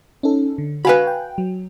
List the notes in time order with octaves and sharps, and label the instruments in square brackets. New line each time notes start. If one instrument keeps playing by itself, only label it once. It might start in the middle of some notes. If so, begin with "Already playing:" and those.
[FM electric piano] C#4 D#4 A4
D3
[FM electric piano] F#4 G#5 [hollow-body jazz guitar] B4 F5 B5
[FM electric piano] G5
F#3